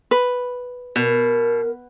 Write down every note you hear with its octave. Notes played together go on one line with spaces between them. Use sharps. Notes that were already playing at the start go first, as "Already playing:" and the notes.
B4
B2 A#4